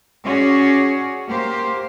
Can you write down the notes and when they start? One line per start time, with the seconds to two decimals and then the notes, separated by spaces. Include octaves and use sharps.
0.25 C#4 F#4 G#4 C#5 D5
1.30 A#3 G4 C5